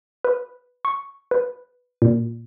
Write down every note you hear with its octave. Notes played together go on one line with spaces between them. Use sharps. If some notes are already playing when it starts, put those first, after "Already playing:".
B4
C#6
B4
A#2